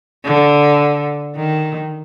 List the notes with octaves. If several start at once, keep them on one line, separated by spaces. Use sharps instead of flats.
D3
D#3